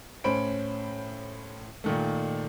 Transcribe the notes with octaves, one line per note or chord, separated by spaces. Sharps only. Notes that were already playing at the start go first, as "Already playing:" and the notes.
A2 C#4 C5 B5 D7
A#2 D#3 A3